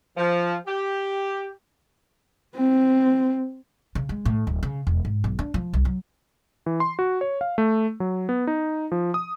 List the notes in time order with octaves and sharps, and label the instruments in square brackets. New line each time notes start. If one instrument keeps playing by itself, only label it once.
[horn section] F3
G4
[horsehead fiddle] C4
[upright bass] C#3
G#3
A2
D1
C#3
E1
G#2
B1
D4
F3
C2
F#3
[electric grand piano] E3
C6
F#4
C#5
F5
A3
F#3
B3
D#4
F3
D#6